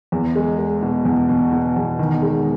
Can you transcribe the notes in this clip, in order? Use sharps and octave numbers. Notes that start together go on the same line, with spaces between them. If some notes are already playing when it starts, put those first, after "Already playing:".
E2
G#3
G#3
B2
E2
B2
B2
E2
D#3
G#3